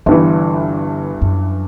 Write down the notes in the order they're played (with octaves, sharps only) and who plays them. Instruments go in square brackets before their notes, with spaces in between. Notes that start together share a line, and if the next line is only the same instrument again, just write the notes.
[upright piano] G1 G2 E3 [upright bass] D3
[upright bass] F#2